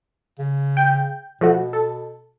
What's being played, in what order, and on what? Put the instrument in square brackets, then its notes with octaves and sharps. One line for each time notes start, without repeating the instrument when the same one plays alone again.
[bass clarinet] C#3
[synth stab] G5
[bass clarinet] B2 [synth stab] F3 A3 F#4
[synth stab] A4